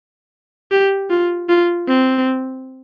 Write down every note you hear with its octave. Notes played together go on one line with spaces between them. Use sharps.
G4
F4
F4
C4